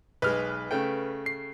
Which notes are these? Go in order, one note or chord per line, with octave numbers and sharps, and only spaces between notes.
B1 G#3 B4 F6
C#3 A3 G5
C7